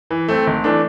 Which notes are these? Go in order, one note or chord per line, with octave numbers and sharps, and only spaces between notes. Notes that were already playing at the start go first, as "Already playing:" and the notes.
E3
A3 C4
G#1
E3 A3 D4